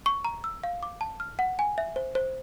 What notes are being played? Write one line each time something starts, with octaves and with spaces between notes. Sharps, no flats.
C#6
A#5
E6
F5
D6
A5
F6
F#5
G#5
E5
C5
C5